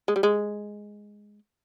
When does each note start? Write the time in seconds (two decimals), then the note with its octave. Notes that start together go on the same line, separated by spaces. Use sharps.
0.08 G#3
0.16 G3
0.23 G#3